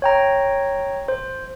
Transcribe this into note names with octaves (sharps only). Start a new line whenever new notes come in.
C#5 G5 A#5
C5